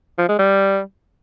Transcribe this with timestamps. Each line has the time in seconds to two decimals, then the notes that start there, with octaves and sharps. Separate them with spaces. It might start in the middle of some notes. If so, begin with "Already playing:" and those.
0.18 F3
0.29 G#3
0.39 G3